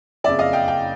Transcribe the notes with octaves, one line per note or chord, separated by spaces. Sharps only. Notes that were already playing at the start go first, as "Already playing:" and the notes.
F#1 F2 C#3 D5 E5
D#5 F5
F5 G5
F5 G5